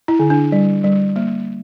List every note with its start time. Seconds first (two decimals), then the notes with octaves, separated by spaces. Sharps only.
0.08 E4
0.20 D3
0.30 D4
0.52 G3
0.84 G3
1.16 A#3